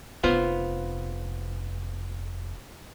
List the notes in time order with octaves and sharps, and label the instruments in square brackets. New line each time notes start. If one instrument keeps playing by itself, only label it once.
[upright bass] F1 [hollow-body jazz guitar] B3 F4 C5